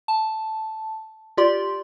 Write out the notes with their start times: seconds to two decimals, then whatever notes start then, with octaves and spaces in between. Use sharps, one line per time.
0.08 A5
1.37 F4 G4 D5 C6